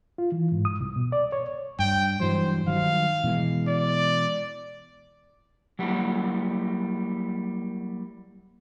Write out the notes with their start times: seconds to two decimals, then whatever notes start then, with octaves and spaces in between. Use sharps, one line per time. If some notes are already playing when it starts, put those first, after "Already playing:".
0.18 F4
0.32 E3
0.52 G#2
0.65 D#6
0.81 C2
0.96 B2
1.12 D5
1.32 C#5
1.79 G2 G5
2.20 G2 E3 F#3 C5
2.67 D#3 F#3 G3 F5
3.24 B2 E3 G#3
3.67 D5
5.79 F#3 G3 A#3 E4 F#4